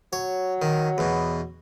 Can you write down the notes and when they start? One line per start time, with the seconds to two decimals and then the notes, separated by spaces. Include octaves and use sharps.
0.13 F#3 C#5
0.62 D#3
0.98 E2 B2